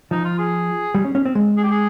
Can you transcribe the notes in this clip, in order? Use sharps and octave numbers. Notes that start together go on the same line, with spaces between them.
F3 D#4
F4
G#4
G3
C#4
C#4
C4
G#3
G#4
G4
G#4